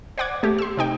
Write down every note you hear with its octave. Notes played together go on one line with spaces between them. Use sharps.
C5 D5 F#5 D6 G#6
A3 G4
C6 E6
C3 D#4 G5